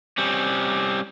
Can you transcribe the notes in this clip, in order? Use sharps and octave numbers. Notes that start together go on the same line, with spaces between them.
G3 C4 C#4